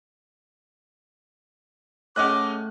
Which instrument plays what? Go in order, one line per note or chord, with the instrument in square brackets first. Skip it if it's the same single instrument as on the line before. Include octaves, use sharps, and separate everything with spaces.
[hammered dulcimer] A2 F#5 [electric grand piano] C#4 D#5 F#6 [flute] D6